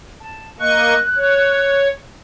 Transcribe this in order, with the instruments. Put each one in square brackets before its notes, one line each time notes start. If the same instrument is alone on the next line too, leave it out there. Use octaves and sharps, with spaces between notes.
[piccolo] A5
[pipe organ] A#3 D#5 C#6 [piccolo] F#6
[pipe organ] C#5